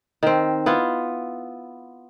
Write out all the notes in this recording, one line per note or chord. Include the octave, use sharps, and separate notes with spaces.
D#3 C4
B3 E4 F4